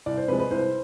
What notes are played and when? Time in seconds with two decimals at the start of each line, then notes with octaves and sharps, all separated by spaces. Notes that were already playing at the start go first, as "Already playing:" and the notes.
0.06 C2 D5
0.17 C5
0.28 C3 F3 G#3 B4
0.39 B4
0.51 C2 C5